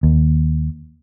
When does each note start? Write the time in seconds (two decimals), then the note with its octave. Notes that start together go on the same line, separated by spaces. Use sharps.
0.03 D#2